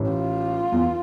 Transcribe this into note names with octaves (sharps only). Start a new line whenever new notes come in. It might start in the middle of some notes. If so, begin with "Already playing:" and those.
Already playing: A1 A2
F4
E2